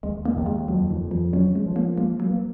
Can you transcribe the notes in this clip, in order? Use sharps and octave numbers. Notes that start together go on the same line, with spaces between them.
D#2 G#3
A#3
D#2
G#3
F2 F#3
D#3
F2
F3
F#3 C#4
G#3
F3
A#3
G#3 A#3
F#3
A#3